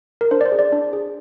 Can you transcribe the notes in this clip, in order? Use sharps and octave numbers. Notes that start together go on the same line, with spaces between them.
A#4
D4 C5
D5
C5
G#4
D5
D4
G#4